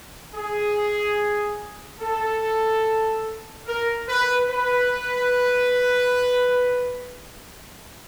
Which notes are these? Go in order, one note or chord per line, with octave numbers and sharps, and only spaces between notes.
G#4
A4
A#4
B4
B4